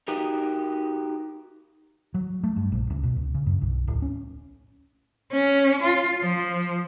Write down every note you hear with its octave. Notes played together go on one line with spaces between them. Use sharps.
D#4 F#4 G4 A#4
F#3
A3
G2
A#1
C#2
B2
C#2
C#3
F#2
B1
D1
C#4
C#4
F4
F3